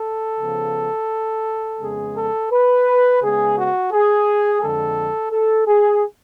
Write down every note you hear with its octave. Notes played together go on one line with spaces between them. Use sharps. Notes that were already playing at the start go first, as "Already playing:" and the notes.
Already playing: A4
C#3 F3 B3
F2 C#3 G#3 B3 G#4
A4
B4
C#3 G#3 B3 G#4
F#4
G#4
F2 D3 G#3 A4
A4
G#4